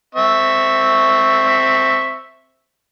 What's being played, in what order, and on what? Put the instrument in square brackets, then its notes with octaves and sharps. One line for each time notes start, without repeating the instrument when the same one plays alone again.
[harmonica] C4 E5 C#6